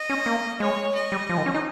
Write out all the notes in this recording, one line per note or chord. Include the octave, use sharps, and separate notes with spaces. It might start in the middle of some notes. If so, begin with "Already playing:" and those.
Already playing: D#5
C#4
A#3
G#3 C#5
D#5
G3
F3
D#3
C#4
D#4